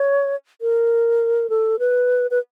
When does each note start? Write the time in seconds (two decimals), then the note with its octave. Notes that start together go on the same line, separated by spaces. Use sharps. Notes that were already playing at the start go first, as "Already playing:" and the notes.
Already playing: C#5
0.61 A#4
1.50 A4
1.79 B4
2.31 B4